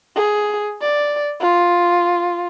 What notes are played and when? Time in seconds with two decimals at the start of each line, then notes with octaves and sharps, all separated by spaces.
0.16 G#4
0.82 D5
1.40 F4